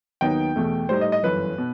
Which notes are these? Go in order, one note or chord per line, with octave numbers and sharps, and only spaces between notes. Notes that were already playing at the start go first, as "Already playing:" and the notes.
D#2 D#3 F#3 B3 D#4 G5
E2 B2 A3
A2 G3 D#4 C5
D#5
D#5
G1 F#2 E3 B4
B2